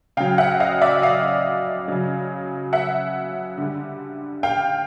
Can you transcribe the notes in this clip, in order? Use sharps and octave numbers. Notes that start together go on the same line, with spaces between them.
C#3 F#3 F5 G5
E5 F#5
D#5 F5
D5 E5
D#5 F5
C#3 F#3
E5 F#5
D3 G3
F5 G5